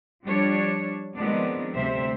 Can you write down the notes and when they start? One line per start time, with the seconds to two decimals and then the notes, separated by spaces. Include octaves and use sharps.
0.25 F3 G3 D4 C#5
1.17 D#3 F3 G#3 B3 C4 D4
1.74 D2 C3 G3 C4 C5 E5